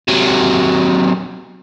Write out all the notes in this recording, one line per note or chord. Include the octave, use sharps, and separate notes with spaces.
C3 F#3